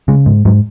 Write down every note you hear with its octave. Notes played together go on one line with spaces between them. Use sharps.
C#3 G#3
G#2
G#2 F#3